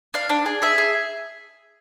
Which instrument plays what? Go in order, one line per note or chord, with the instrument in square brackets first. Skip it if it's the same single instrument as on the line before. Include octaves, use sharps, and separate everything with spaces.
[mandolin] D4 F5
D4
G#4
G#4 E5
G#4